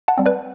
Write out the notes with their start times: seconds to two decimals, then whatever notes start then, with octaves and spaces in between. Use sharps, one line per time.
0.08 F#5 A5
0.18 G3 C4
0.26 B4 D5